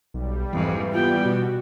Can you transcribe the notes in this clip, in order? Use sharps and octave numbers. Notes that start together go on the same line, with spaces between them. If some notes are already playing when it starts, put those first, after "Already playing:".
B1 G3
F2 G#2 E3
B3 F4 G5
B2 F#4